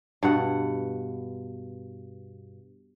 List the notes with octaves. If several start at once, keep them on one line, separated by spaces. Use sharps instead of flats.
G2 B2 F#5